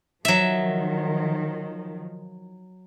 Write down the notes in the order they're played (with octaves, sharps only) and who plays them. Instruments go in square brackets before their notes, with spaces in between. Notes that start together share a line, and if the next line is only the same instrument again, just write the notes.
[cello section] D#3 F3 [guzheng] F#3 E5